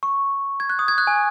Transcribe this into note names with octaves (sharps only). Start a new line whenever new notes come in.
C#6
G#6
F#6
D#6
G#6
F#6
G#5